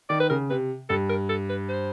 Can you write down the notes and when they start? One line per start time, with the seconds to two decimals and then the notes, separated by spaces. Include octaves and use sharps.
0.10 D#3 D5
0.20 B4
0.30 C#3 A#4
0.50 C3 B4
0.89 G2 A4
1.09 A#4
1.30 A4
1.50 B4
1.69 C5